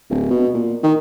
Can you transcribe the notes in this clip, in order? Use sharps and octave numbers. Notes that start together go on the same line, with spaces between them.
D1
B2
A#2
D#3